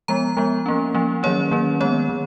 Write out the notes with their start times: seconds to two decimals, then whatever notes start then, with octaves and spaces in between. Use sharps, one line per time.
0.08 F3 G#3 B3 A#5
0.37 F3 G#3 B3
0.66 F3 A#3 C#4
0.95 F3 A#3 C#4
1.23 D#3 F#3 A#3 C#4 C#5
1.51 D#3 F#3 A#3 C#4
1.80 D#3 G#3 B3 C#5
2.09 D#3